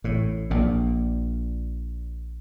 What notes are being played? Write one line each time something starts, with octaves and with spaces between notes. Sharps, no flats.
A1 A2
A#1 A#2